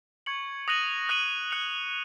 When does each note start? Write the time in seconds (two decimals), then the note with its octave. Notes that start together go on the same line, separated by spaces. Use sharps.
0.26 C#6 G#6 C#7 F#7
0.68 D#6 F#6 A#6 D#7 F#7
1.09 D#6 F#6 A#6 D#7 F#7
1.51 F#6 C#7 F7